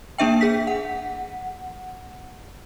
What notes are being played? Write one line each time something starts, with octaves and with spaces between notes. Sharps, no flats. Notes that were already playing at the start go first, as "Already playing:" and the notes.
A#3 D4 E5 G5
G#4 B6
F#5